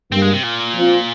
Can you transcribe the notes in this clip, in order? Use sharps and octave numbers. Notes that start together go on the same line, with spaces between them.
G2 G3 A#3 C4
G#3
C3
A#2
F3 C4 F4